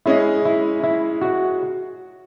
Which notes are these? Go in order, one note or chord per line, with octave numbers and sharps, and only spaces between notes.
G#3 C#4 E4 G#4 D#5
E4
E4
F#4